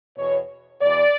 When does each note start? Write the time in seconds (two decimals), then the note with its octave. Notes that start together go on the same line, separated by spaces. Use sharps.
0.18 E2 B2 C#5
0.81 E2 B2 D5